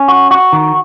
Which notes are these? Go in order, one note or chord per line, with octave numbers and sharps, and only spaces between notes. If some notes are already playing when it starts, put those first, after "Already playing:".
Already playing: C#4
F#4
F#4
D#3